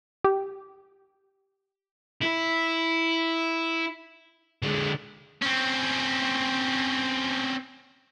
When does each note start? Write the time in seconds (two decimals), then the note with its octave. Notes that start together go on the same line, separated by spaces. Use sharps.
0.24 G4
2.22 E4
4.62 D3 G#3
5.42 C4 C#4